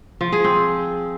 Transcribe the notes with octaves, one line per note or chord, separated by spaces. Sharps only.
F3
G#4
C4